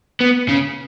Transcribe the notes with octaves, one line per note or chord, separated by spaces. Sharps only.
B3
C#3